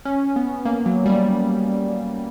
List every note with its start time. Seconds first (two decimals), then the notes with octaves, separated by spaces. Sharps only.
0.05 C#4
0.36 B3
0.65 A#3
0.86 F#3
1.06 G3